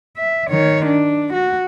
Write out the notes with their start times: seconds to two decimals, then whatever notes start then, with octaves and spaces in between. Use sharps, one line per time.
0.17 E5
0.50 D#3 C#5
0.86 D4
1.33 F#4